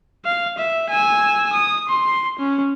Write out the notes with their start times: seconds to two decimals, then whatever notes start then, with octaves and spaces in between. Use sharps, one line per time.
0.25 F5
0.58 E5
0.91 G#5 E6
1.53 D#6
1.89 C6
2.39 C#4